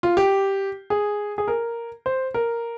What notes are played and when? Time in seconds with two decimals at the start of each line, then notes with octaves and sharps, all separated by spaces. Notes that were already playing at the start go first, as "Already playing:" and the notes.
0.03 F4
0.17 G4
0.90 G#4
1.38 G#4
1.48 A#4
2.06 C5
2.34 A#4